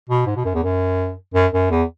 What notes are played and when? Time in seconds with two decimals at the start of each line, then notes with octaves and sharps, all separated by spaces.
0.09 B2
0.27 G#2
0.36 B2
0.45 F#2
0.54 E2
0.63 F#2
1.34 F#2
1.53 F#2
1.71 E2